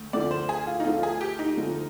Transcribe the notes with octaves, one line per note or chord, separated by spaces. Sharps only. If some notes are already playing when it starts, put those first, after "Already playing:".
Already playing: D2
D2 D3 F3 D5
C5
G#4
F4
D#4
D2 D3 F3 F4
G#4
G4
D#4
D2 D3 F3